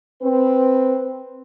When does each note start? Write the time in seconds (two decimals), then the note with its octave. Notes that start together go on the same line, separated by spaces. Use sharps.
0.23 C4 B4